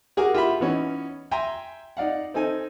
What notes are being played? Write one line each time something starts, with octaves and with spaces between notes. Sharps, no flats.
F#4 G#4 A#4 F#5 D6
E4 F4 G4 E5 F#5 B5
E3 B3 C#4 D#4
E5 G5 G#5 A#5 C6
D#4 D5 F5 F#5
C4 D#4 A4 G#5